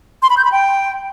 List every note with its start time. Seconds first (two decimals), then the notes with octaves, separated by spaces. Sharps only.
0.22 C6
0.30 B5
0.37 G6
0.45 B5
0.52 G5